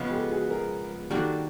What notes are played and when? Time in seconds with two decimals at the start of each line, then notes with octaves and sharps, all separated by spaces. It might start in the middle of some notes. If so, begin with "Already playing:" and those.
Already playing: C#3 F3 G#3 B3
0.11 G4 A4
0.31 F#4 G#4
0.51 G#4 A#4
1.10 D#3 G3 A#3 D4 F#4 G4 A4